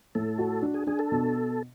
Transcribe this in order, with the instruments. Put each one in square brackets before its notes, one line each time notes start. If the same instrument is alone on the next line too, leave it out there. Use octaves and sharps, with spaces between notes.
[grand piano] A2 [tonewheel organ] A4
[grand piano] F#4
D4
[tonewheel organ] G#4
[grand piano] D4 [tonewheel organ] G#4
[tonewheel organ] A4
[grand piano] B2